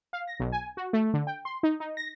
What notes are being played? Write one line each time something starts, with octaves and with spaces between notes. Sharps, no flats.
F5
A#6
B1
G#5
F#4
A3
D3
G5
C6
D#4
D#4
A#6